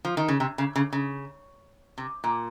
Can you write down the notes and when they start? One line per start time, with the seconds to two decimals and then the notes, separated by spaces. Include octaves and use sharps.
0.05 F3
0.17 D#3
0.28 C#3
0.40 C3
0.58 C#3
0.76 C#3
0.92 C#3
1.98 C3
2.24 A#2